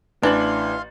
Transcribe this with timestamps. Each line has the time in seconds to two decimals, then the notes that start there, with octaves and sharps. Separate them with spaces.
0.23 A1 E3 D4 F5 C6 A6 F#7